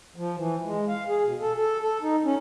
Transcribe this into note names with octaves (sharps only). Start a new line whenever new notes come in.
F3
E3
G#3
F5
G#4
B2
A4
A4
A4
D#4
C#4